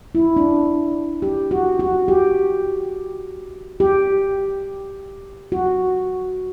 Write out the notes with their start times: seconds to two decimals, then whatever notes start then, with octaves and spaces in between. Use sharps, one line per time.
0.15 E4
0.37 D4
1.22 G4
1.51 F#4
1.80 F#4
2.08 G4
3.80 G4
5.52 F#4